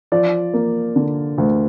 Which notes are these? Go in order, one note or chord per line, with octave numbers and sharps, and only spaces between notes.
F3 D5
A#3
D3
D2